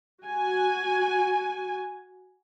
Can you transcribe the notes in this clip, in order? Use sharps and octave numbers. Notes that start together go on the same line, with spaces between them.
F#4 G#5